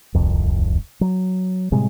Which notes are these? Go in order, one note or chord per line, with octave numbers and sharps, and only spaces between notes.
D1 C2 F2
F#3
A2 C3 G3 G#3